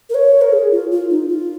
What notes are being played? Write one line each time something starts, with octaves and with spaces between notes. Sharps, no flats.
A#4
C#5
A#4
G#4
F4
F4
D#4
F4